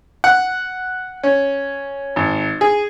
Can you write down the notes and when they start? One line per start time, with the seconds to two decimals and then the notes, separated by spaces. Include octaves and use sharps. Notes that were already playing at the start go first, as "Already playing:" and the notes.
0.24 F#5
1.23 C#4
2.16 G#1
2.61 G#4